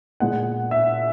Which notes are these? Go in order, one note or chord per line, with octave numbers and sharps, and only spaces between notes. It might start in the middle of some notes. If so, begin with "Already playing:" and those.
A#2 G#3 B3 F#5
E5